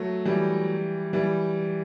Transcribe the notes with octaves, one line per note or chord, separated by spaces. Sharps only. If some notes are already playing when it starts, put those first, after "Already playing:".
Already playing: F#3 A3
E3 G3
E3 G3